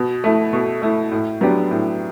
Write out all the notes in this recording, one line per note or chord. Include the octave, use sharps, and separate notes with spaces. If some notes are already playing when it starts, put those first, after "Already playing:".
Already playing: B2
A3 E4
B2
A3 E4
A2
F#3 B3 D4 G4
A2